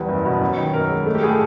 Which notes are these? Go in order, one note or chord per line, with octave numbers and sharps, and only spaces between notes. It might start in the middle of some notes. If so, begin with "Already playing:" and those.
Already playing: E2 G3 B4
F#1
B2
F#2
D#3
F#2 A#4
G#3
A3
G4
A2 G#4
A4